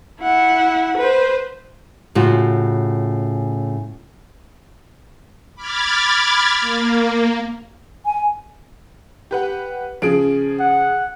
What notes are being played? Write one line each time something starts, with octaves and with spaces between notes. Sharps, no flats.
E4 F#5
B4 C5
A2 C#3 F4 F#4
B5 D6 F6 G#6 A6
A#3
G#5
G4 B4 F#5
C#3 F3 G#4 D7
F#5